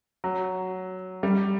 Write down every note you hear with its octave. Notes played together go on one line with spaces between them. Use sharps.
F#3
G3